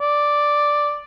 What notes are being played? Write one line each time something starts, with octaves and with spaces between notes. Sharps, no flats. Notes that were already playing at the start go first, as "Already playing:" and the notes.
D5